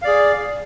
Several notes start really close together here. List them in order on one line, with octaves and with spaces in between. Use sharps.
F5 D5 G#4